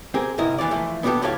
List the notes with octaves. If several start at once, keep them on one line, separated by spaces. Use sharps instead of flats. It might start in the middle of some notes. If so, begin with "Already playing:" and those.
C4 G4 G#4 A#4
C2 G#2 D3 E4 A#4 D#5
D#2 E3 F4 D5
E3 F3 A3
B3 D4 E4 F#4 G4 A4
C#2 A2 G4 A4 C#5 F5